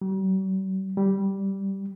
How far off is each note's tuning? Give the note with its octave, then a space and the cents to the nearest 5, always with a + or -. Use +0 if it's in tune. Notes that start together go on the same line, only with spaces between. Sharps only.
G3 -45
G3 -5